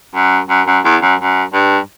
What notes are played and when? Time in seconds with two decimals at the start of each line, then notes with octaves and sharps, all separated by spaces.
0.15 F#2
0.49 F#2
0.67 F#2
0.85 E2
1.02 F#2
1.19 F#2
1.54 G2